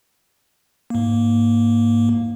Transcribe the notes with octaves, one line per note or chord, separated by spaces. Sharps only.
G#2 A#3